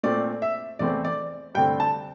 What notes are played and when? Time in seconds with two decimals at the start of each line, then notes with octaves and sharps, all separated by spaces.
0.03 A#2 A3 C4 D5
0.42 E5
0.79 E2 E3 A3 C4 D5
1.05 D5
1.55 G2 D3 A3 C4 G5
1.80 A5